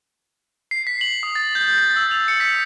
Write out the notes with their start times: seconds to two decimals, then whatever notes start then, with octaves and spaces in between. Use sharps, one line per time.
0.71 C7
0.87 B6
1.01 F#7
1.23 D#6
1.35 A6
1.55 G6
1.78 A6
1.96 E6
2.11 F7
2.28 C#7
2.40 B6